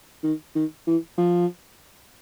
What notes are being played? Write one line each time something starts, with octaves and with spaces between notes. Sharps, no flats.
D#3
D#3
E3
F3